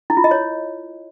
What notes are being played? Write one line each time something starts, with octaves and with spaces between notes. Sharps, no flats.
E4
F4
D#5
C#5